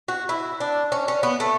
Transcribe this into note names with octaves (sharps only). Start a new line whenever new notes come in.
F#4
E4
D4
C#4
C#4
B3
A3